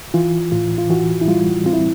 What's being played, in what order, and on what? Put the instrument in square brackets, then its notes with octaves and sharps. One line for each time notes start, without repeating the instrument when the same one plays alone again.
[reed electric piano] E3 [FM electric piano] F4
[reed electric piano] A2 [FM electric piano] F4
[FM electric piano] F4
[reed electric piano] E3 [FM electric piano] F#4
[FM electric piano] E4
[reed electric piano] G3 [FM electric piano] F4
[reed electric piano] C4 [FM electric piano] F4
[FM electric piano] E4